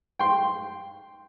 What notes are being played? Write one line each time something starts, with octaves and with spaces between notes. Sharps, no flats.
G5 C6